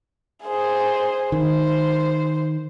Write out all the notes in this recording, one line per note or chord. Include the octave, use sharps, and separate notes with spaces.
G#4 C5
D#3 C5